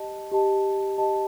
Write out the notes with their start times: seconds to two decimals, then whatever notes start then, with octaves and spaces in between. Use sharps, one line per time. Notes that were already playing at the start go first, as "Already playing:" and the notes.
Already playing: G4 D#5 A5
0.32 G4 D#5 A5
0.98 G4 D#5 A5